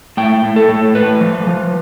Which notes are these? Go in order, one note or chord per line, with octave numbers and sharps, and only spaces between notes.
A2 G5
A2
A4
A2
A2 B4
F3
F3